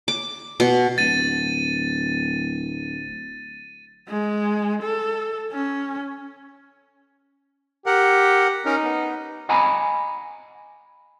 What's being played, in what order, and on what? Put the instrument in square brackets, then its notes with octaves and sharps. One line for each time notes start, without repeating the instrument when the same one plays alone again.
[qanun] D6
B2
[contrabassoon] D1 [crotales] A6 D#7
[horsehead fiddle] G#3
A4
C#4
[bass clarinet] G4 [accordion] A#4 F#5
[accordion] C#4 A#4 [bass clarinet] D#4
[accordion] B3
[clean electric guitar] D#5 F#5 G#5 A#5 B5